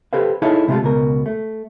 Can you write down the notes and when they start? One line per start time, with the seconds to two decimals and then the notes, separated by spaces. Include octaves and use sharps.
0.13 G4 A4 B4 C5 F5
0.42 D#4 E4 G#4 A4 C#5 F5
0.68 C3 G#3 A3 C#4 F4 A4
0.83 C#2 B2 A#4
1.26 A3